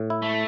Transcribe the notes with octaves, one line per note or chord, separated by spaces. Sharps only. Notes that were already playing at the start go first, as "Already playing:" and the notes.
Already playing: A2
E4
A3